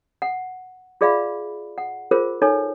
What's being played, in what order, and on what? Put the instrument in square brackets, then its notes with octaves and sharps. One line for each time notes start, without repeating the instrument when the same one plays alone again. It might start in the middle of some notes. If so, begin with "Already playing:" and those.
[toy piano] F#5
F4 G#4 D5 E5 F5 B5
F#5
F4 G#4 A#4 C5
D#4 A4 C#5 G#5